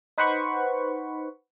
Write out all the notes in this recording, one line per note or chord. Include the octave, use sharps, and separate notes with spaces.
D#4 B4 C5 F#5 B5 C#6